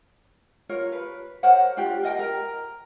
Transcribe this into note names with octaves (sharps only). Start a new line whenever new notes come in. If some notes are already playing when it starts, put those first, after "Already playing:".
F4 A#4 C#5
B4
A#4 C5 C#5 F#5
D4 F4 G4 G5
A#4 D#5 F5 G5
A#4